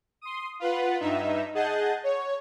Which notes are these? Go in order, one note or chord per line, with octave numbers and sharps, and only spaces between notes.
C6 D#6
F4 B4 F#5
G2 D#4 E5
G#4 D#5 F#5 A5 G6
C#5